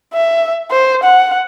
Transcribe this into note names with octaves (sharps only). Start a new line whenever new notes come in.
E5
C5
F#5